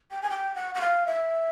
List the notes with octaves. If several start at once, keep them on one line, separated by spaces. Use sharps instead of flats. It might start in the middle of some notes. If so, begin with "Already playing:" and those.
G5
G#5
G5
F#5
F#5
F5
E5